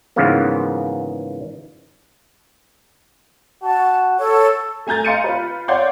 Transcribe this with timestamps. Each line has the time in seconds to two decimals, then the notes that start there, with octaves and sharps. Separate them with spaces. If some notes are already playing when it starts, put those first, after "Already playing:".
0.16 G#2 C#3 E3 F3 A#3 B3
3.63 F#4 A5
4.19 A4 C#5
4.87 A3 G#5 A#5 G6 A6
5.05 D#5 F5 C6 C#7 D#7
5.24 F4 B4
5.68 C#5 D5 F5 F#5 C6 G6